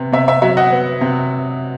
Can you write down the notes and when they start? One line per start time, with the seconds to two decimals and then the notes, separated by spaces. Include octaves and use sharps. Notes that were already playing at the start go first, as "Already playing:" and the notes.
Already playing: C3 B3
0.12 C3 E5
0.28 E5
0.42 F#3 E5
0.57 D#5 F#5
0.72 B3
1.01 C3